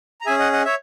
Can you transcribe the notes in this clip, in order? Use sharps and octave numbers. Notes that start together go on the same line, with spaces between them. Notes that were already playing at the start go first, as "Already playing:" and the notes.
A#5
C#4 G#4 E5 G#5
D#5 F#5
D#5 F#5
C#5 E5